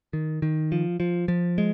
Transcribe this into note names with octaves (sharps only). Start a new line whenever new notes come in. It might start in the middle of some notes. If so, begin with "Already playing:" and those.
D#3
D#3
F3
F3
F3
G#3